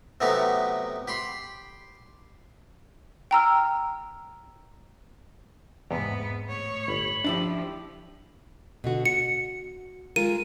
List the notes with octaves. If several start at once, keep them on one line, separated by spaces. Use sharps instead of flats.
C3 F#3 A3 B3 D#4 G4
G4 B5 C6
G5 A#5 E6 F6
E2 G#2 C3 B3
A2 C#5
G1 B5
F3 D4 E4 G4
B2 D3 F#4
F#4 C#7
G#3 F4 A#4 D#7